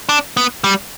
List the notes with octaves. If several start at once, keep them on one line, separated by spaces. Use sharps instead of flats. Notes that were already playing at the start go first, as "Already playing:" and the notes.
D4
B3
G3